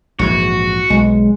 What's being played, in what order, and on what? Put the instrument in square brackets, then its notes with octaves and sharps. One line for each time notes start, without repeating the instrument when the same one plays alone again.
[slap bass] A#1 G#2 E3 [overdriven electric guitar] F#4
[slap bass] B1 [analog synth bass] G#3